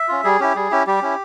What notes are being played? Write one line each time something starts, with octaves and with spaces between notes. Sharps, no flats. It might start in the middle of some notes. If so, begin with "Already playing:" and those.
Already playing: E5
C#4 F4
G3 G#4
C#4 E4 G4
G3 G#4
C#4 E4 G4
G3 G4
C#4 E4